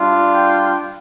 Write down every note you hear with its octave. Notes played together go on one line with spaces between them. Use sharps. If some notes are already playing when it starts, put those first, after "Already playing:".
Already playing: G3 D4 F4
G5